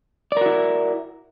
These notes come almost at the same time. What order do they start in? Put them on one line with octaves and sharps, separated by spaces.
D5 A#4 F#4 E4